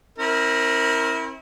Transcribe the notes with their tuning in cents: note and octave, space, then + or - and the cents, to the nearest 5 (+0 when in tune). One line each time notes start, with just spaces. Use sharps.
C4 +30 E4 -30 A#4 +0